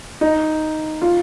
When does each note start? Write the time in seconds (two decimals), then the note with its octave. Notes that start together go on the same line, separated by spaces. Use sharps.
0.21 D#4
1.02 F4